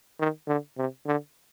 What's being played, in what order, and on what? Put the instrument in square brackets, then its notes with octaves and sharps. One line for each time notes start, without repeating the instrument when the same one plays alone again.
[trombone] D#3
D3
C3
D3